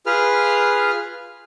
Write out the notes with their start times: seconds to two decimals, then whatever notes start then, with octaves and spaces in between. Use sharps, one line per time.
0.06 F4 G#4 B4 F6